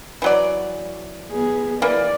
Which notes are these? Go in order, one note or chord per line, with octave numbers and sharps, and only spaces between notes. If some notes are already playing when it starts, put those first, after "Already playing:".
E3 F#3 D5
B3 G#4
E3 A#3 D5